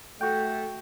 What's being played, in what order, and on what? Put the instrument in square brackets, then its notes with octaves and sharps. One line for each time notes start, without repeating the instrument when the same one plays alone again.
[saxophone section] A3 [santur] F#4 G5